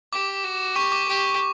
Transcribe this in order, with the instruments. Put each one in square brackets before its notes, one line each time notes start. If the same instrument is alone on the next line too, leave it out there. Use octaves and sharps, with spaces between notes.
[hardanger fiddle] G4 [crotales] D6
[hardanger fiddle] F#4
[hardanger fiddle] G4 [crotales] C#6
[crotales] D6
[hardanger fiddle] G4